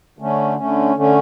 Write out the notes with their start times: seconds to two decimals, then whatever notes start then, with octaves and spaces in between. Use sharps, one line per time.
0.19 D3 A3 C#4
0.57 D3 A3 C#4
0.95 D3 A3 C#4